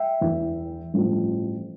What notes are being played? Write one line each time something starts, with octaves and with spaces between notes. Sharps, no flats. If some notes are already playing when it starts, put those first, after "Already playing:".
Already playing: E5 G5
E2 E3
A1 G2 F3